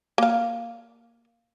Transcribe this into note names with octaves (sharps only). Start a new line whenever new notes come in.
A#3 F5